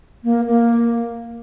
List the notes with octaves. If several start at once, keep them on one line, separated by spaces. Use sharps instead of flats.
A#3
A#3